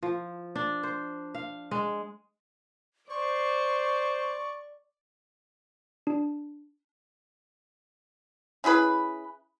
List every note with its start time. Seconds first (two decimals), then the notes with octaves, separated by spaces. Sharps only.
0.03 F3
0.55 D4
0.83 C5
1.35 F5
1.71 G#3
3.10 C5 D5 C#6
6.07 D4
8.64 C#4 E4 G#4 B4